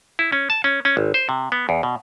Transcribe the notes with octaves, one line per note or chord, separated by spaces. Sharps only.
E4
C#4
A5
C#4
C#4
G#1
C5
C3
B3
E2
B2